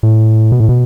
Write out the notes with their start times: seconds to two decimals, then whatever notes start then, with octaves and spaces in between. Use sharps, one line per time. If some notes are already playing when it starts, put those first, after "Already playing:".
0.03 A2
0.52 B2
0.60 A2
0.69 B2